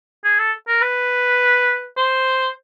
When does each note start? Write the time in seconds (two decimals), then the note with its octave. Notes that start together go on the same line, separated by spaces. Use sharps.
0.24 G#4
0.39 A4
0.68 A#4
0.82 B4
1.97 C5